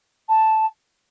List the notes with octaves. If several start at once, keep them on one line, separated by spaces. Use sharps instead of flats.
A5